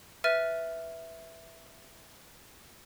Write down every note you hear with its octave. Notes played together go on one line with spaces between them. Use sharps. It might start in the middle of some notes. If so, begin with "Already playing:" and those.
B4 E5 F6 A6 D#7